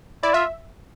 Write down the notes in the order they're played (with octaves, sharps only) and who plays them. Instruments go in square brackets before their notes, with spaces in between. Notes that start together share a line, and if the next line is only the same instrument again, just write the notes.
[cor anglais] E4 [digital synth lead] D5
[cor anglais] F4 [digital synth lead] E5